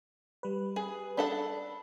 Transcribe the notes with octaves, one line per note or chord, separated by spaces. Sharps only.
G3 B4
G#4
D4 A4 F#5 B5